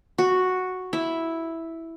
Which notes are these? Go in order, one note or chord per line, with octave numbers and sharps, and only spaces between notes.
F#4
E4